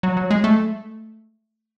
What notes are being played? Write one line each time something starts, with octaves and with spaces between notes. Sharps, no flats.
F#3
F#3
G#3
A3